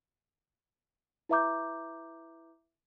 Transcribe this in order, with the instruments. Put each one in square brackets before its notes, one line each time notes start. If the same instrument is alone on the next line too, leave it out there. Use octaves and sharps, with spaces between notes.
[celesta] E4 B4 E5 A#5 D6 G6